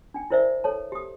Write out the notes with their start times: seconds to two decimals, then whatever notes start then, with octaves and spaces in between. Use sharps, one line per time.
0.14 D4 G5
0.30 E4 A#4 C5 D5 E5
0.64 A4 C#5 A5
0.92 G4 D#6